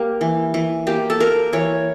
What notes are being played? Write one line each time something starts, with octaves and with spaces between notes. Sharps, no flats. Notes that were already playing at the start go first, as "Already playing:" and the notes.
Already playing: A#3 G4
E3
E3
A#3 G4
A4
A#3 A#4
E3 C#5